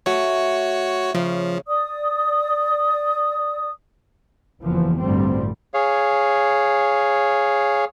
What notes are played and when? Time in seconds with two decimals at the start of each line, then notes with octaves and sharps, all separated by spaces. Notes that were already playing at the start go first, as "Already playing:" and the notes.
0.06 A3 F#4 C#5
1.14 C#3 F3
1.67 D5 D#6
4.63 F#1 E2 E3 F3
5.00 A1 D2 G2 G3 C4
5.74 G#4 C#5 F5